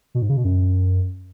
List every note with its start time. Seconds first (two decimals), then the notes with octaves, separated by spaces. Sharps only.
0.15 B2
0.22 G#2
0.29 C#3
0.37 B2
0.44 F#2